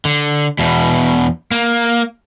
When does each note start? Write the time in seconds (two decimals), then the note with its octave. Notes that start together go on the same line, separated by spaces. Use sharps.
0.05 D3
0.59 E2 B2
1.51 A#3